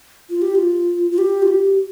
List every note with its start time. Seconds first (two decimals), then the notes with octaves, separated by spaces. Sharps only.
0.29 F4
0.42 G4
0.55 F4
1.11 F4
1.18 G4
1.43 F4
1.48 G4